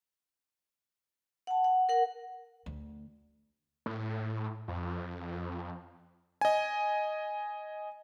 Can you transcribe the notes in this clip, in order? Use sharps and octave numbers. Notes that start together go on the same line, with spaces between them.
F#5 A5
F#5
A#4 F#5
D2
A2
F2
D#5 G#5